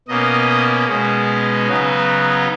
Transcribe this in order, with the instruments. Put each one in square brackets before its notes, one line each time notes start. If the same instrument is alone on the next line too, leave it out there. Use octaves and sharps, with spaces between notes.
[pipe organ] B2 A#3 C#4 D#5
B2 G#3 C#4
C#3 F#3 B3 D#4